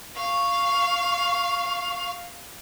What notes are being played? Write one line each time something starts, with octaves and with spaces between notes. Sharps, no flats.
F5 C#6